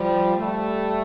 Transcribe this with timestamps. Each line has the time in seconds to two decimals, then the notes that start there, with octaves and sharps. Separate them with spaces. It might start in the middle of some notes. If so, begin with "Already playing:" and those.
Already playing: F3 G3
0.37 G3 A3